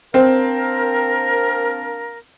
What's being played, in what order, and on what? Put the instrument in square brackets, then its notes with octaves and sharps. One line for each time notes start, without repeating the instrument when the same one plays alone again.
[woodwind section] A#3 D4 A#4 [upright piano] C4